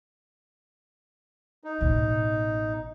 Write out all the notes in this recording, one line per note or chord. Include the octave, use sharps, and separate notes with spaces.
D#4
A1 B2